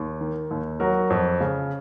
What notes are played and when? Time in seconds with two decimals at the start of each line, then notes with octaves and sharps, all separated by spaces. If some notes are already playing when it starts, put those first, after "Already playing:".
Already playing: D#2
0.21 D#3
0.51 D#2
0.80 F#3 F#4 A#4
1.10 F2
1.40 C#3